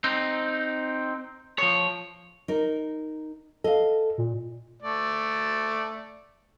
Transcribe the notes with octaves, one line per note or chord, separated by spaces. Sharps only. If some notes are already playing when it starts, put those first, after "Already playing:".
C4 D#4
F3 C#5
D#4 A#4
A4 D#5 F5
A#2
A3 D5